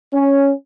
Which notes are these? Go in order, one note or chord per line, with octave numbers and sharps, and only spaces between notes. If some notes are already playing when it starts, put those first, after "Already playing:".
C#4